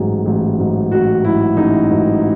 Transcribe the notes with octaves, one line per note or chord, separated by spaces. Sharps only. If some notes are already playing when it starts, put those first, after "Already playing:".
Already playing: A1 G#2 F#3 G#4
A1
G#2 F#3
A1 F#4
G#2 F#3 E4
A1 D#4
G#2 F#3